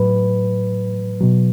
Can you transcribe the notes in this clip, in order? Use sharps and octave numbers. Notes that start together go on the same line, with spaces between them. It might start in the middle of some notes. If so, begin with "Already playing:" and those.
Already playing: A2 F#3 B4
B2 F#3